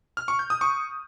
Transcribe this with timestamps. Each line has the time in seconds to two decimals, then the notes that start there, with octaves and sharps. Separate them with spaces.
0.17 F6
0.28 C#6
0.39 G6
0.50 D#6
0.61 C#6